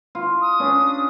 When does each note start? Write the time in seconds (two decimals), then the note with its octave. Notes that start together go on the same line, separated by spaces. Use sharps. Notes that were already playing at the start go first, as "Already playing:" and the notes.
0.15 F4
0.41 D#6
0.60 C#4 D4